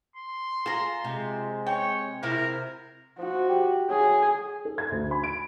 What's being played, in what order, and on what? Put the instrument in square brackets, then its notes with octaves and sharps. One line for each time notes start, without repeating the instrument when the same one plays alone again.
[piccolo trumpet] C6
[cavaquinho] F4 A#5 [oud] G#4
[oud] C3 [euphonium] G#3
[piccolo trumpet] C#5 [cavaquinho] G5
[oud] C3 E4 [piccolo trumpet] A#4
[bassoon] F3 [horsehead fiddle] F#4
[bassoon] G4
[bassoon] F#3 [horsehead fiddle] G#4
[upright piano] A4
G#6
D2
B5
D7